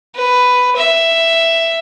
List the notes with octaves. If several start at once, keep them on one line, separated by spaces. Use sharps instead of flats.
B4
E5